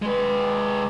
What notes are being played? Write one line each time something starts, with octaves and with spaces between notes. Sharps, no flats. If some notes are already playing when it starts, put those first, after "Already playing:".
G#3 B4